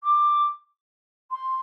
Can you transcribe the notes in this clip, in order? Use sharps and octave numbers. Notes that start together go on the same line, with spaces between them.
D6
C6